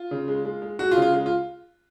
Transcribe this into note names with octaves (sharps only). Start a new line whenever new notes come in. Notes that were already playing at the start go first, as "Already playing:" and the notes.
Already playing: F4
C#3
G#3
G#3
G#3
G#3 F#4
F4
C#3
F4
G#3
F4